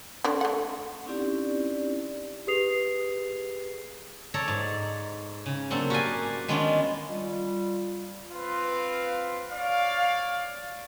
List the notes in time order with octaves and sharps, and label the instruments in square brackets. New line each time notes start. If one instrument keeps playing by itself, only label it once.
[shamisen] D3 C#4 D5
A3 F#5
[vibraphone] C4 C#4 D#4 E4 G4 D5
[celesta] G4 G#4 B4 D#6 C7 F7
[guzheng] A4 C#5 D5 A#5
G#2
C#3
F#3 A#3 C4 D4 A4
F#4 G4 A#4 D5 F5 G#5
D#3 G#3 B3 C#4 D4 F4
[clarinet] G3 [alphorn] F4
[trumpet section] C4 F4 B4 F5
C#5 D5 F5